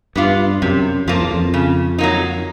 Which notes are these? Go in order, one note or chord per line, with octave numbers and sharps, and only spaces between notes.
G2 B3 D4 F4
F#2 C3
F2 F3 A#3
E2
F2
C#3
F#3 A#3 D#4